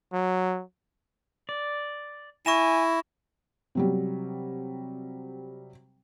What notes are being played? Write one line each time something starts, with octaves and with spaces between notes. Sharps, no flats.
F#3
D5
E4 G#5 C#6 A#6 E7
C3 F#3 G3